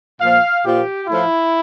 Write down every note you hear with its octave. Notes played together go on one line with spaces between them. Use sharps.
A#2 F3 F5
A#2 F3 G4
A2 F3 E4